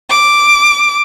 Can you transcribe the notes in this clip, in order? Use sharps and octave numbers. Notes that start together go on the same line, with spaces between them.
D6